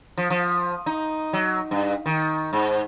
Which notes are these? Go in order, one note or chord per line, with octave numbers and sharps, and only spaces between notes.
F3
F3
D#4
F#3
G2
D#3
G#2